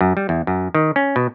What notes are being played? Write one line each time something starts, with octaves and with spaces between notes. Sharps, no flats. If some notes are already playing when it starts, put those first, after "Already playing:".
F#2
G3
E2
F#2
D#3
C#4
B2